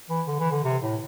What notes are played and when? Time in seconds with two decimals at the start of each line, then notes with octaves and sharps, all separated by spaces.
0.10 E3
0.27 D3
0.40 E3
0.52 D3
0.64 C3
0.83 A2